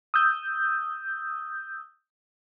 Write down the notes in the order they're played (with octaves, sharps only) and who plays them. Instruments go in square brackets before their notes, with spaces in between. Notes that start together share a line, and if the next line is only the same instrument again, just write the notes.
[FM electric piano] D#6 E6 G6